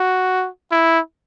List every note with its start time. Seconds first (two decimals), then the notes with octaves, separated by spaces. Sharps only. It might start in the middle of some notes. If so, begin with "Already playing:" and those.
Already playing: F#4
0.72 E4